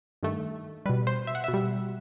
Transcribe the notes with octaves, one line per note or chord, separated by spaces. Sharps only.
G2 D#3 A3
B2 G3 B4
C5
E5
F#5
B2 E5
G3